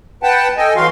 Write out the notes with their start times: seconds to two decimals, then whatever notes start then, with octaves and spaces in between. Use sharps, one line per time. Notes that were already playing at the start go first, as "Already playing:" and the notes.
0.23 B4 F#5 G5 A5
0.57 A4 D#5 G5 G#5
0.76 E3 F#3 F#4 F5 C6